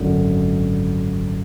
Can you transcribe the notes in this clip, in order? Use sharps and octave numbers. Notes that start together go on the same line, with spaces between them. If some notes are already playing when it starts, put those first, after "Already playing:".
Already playing: G#1 F#2 D3